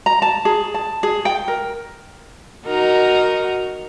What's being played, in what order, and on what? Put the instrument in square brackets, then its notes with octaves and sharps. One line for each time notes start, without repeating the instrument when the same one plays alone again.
[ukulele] A#5
A5
G#4
A5
G#4
G5
A#4
[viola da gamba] D#4 F#4 A#4